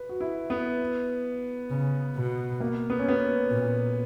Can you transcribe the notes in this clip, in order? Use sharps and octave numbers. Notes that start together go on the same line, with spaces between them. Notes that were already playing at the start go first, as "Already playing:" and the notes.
Already playing: B4
F#4
E4
B3
C#3
B2
A#3
B3
C#4
B3
A#2